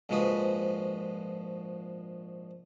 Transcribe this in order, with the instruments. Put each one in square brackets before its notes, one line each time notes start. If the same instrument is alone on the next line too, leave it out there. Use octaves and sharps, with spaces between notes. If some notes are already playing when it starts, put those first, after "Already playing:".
[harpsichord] A#1 G#2 F3 G#3 F#4 B4